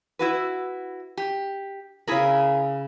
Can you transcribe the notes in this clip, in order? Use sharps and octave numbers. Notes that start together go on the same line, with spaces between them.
E4 F#4 B4
G4
C#3 E4 G#4 A#4 B5